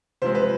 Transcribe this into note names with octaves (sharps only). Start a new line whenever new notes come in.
C3 F3 G#3 C5
B4